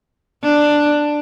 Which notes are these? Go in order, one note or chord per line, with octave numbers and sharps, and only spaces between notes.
D4